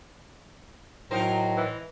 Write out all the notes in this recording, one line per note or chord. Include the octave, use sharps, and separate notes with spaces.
A2 F#3 D#4 A#4 C5
E3